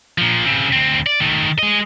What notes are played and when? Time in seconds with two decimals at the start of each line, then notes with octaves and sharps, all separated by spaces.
0.18 A#2 F3
0.46 C#3 C4
0.73 D2 C4
1.06 D5
1.20 D#3 A3
1.59 G#3 D#5